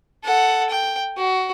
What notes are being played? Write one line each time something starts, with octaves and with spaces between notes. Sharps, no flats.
A4 F#5
G5
F#4